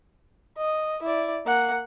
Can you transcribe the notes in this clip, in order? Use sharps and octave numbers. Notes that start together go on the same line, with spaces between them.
D#5
E4 D5
A#3 F#5